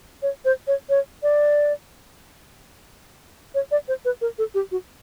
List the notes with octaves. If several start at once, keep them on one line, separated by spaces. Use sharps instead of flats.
C#5
C5
C#5
C#5
D5
C#5
D5
C5
B4
A#4
A4
G4
F#4